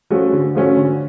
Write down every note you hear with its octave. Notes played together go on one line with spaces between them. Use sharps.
F3 A3 C#4 F#4
D3
F3 A3 C#4 F#4
D3